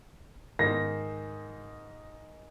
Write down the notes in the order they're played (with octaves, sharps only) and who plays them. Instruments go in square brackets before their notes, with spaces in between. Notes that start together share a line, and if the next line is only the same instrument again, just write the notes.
[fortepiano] G#2 D#3 [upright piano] A#6